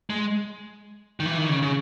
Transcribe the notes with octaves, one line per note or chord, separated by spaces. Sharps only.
G#3
D#3
E3
D#3
C#3
C#3